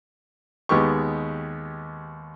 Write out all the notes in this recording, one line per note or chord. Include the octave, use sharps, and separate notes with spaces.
D#2 G#3 B3 G4 C#6